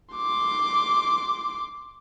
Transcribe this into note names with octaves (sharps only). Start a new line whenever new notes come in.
C6 D6